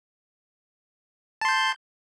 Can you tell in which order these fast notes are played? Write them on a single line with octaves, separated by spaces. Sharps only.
A5 C6 G6